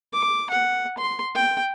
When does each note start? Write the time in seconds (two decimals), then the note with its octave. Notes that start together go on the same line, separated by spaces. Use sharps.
0.13 D6
0.50 F#5
0.98 C6
1.35 G5